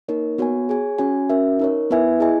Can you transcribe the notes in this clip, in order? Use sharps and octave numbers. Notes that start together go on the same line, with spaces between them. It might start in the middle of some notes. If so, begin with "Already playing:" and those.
A#3 D#4 A#4 C#5
B3 F#4 C#5 G#5
G#4 C#5 G#5
C#4 F#4 C#5 G#5
C#4 F#4 A#4 E5
D#4 A#4 C#5
B3 E4 B4 E5 G#5
E4 G#4 D#5 G#5